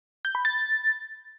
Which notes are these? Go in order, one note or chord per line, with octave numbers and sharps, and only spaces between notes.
G6
B5
A6